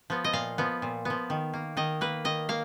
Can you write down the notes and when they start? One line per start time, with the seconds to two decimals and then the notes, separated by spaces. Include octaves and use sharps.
0.10 F3 B3
0.24 D#5
0.33 A#2 F5
0.58 F3 B3
0.82 A#2
1.05 F3 B3
1.30 D#3
1.54 A#3
1.77 D#3 D#5
2.01 A#3 B4
2.25 D#3 D#5
2.49 A#3 F5